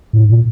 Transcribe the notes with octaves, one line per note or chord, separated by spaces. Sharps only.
A2
A#2